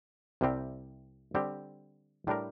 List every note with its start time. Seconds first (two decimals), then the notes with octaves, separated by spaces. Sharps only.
0.41 C2 C3 G3 C4 G4
1.35 D3 G3 C4 G4
2.27 A2 G3 D4 G4 A#4